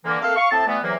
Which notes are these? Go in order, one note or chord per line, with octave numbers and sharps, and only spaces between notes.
D3 E3 A#3
A3 A#3 C4 A4 F5
F5 C#6
A2 C3 C4 A5
E3 G3 A3 B3
E2 C3 E3 F#3 A#3